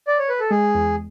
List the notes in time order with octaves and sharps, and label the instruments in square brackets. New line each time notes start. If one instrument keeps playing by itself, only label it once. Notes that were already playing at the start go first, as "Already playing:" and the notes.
[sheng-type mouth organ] D5
C#5
B4
A4
[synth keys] G#3 [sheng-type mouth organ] G#4
[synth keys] E2